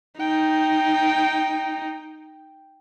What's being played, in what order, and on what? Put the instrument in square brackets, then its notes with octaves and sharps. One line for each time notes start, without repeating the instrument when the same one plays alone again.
[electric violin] D#4 [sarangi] G5